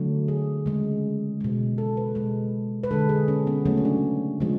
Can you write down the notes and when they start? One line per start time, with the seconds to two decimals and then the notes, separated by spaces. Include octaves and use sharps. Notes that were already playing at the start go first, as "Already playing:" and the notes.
Already playing: D3 F#3 A3
0.28 G#4
0.66 C#3 G#3
1.41 B2 G#3
1.78 A4
1.97 B4
2.15 B2 G#3
2.84 B4
2.91 D3 G#3 A4
3.09 G#4
3.28 C#4
3.47 B3
3.65 C#3 F#3 A3 C#4
3.78 C#4
3.85 D4
4.40 C#3 F3 G#3